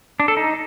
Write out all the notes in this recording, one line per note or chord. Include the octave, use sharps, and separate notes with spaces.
D4
A4
D#4